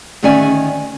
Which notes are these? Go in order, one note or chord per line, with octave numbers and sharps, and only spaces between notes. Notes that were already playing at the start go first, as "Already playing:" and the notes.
D2 D#3 C#4 D5 E5 G#5